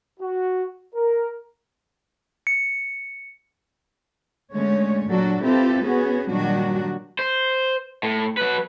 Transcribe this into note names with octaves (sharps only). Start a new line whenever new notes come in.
F#4
A#4
C#7
D3 G#3 A3 C#4 C#5
A#2 F#3 D4 F#4 A4
C4 E4 F4 G4 A4 B4
B3 C#4 F#4 G#4
A#2 D#3 F#3 G3 D4 F#4
C5
A2
F#3 B4